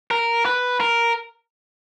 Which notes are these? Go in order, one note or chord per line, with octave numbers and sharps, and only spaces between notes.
A#4
B4
A#4